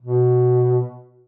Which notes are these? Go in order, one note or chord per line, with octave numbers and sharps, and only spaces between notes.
B2